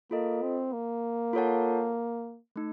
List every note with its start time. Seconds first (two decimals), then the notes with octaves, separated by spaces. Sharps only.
0.11 A#3 F4 A4 D#5
0.42 C4
0.73 A#3
1.33 F4 A4 C#5 F#5 A5
2.56 A3 D#4